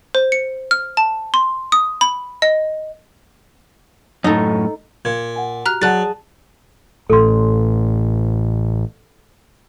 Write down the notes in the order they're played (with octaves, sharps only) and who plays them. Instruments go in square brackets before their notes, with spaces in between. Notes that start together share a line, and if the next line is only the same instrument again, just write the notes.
[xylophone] C5
C#7
F6
A5
C6
D#6
B5
D#5
[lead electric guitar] F#2 A2 [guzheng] D#4 A4
[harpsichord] A#2 [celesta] G#6
[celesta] F#5 G#5
[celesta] F#4 G4 [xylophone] A#5 F6 F#6
[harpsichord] F#3 [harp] G#4 A5 [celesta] D5 F#5 [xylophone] F#6 A6
[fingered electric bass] A1 A2 [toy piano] A4 C6